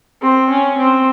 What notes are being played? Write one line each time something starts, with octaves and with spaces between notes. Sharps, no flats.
C4
C#4
C4